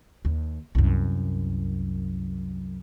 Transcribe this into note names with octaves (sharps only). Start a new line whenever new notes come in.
D#2
C2 F#2